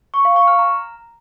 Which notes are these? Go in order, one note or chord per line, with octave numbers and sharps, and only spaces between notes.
C#6
F5
C#6
F6
A#5